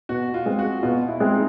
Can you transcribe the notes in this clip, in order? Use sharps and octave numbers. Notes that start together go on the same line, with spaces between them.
B2 F#4
F4
G#3 C4
F#4
B2 F4
E4
G#3 C4
D#4